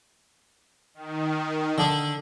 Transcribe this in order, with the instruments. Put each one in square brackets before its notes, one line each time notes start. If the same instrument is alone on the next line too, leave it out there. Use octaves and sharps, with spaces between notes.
[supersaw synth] D#3
[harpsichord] D3 D4